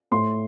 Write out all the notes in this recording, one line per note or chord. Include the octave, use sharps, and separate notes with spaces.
A2 C6